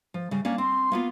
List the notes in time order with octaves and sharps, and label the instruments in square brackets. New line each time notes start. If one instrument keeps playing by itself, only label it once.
[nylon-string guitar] F3
C#3 G3
A#3 C#4 D4
[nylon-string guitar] C4 [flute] C6
[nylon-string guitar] A#3 B3 F4